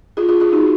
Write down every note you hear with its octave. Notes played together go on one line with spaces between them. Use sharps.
F4 G#4
F4 G#4
F4 G#4
D#4 F#4